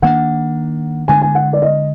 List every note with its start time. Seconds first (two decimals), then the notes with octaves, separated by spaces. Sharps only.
0.02 D#3 A#3 D4 F#5
1.08 D3 G#3 D4 G#5
1.22 G#5
1.35 F#5
1.53 D5
1.62 D#5